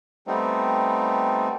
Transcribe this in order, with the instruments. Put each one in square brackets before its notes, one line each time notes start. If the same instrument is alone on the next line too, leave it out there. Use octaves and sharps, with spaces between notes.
[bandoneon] G3 A3 B3 C4 D#4